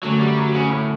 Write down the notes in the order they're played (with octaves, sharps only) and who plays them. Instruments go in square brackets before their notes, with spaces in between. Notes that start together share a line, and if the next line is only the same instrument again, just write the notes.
[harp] F#2 D3 A3 D4 [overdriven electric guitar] F#3
[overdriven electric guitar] G3
F#3
C#3
A2